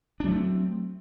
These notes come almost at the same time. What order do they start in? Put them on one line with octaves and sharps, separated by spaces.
D4 F#3 A3 C4